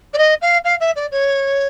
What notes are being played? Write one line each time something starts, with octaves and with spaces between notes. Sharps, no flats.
D5
D#5
F5
F5
E5
D5
C#5